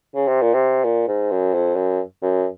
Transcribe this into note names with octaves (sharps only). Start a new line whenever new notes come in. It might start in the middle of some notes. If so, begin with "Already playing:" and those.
C#3
C3
A#2
C3
A#2
G#2
F#2
F2
F#2
F#2